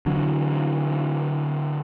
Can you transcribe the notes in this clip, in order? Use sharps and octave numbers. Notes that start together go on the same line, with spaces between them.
D3 E3 F#3